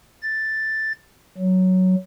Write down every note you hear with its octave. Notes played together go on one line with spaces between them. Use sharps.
A6
F#3